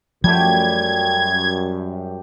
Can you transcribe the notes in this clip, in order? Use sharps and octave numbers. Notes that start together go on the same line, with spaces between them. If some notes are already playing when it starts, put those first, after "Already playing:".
F#2 F3 G3 A3 G4 G#6